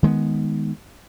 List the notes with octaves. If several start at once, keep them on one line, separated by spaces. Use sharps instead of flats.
D#3 G#3 A#3 B3